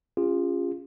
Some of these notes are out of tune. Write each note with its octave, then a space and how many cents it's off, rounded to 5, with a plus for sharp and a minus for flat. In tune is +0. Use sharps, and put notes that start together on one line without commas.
C#4 +0 F4 +0 G#4 -45